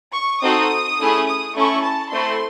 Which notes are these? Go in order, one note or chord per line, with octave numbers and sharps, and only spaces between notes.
C#6
C4 D#4 F#4 A4 D#6
A3 C#4 E4 G#4
D#6
A3 C#4 E4 A4 C#6
A5
A3 C4 E4 A4 C6